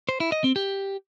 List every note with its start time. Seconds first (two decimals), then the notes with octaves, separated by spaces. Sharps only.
0.09 C5
0.20 E4
0.32 D#5
0.44 C4
0.56 G4